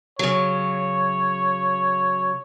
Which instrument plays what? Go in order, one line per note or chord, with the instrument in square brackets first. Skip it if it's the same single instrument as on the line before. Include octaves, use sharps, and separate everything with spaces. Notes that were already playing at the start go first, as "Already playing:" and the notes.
[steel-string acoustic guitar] C#3 F#3 [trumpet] C#5